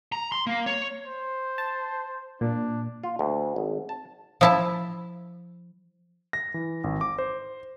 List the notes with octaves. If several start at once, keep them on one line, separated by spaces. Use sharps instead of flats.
A#5
C6
A#3
C#5
C5
A5
A#2 D4
F4
D2
G#1
A5
F3 E4 A5
A#6
E3
G#1
D6
C5